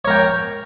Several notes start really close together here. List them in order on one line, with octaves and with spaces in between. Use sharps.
C#5 A#4 G5